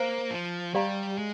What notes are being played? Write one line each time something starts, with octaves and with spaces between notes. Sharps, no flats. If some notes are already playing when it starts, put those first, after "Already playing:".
Already playing: A#3 C5 F5 A#5
F3
G3 G4 D5 F5 A#5
G#3